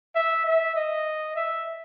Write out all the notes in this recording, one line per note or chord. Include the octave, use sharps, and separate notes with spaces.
E5
E5
D#5
E5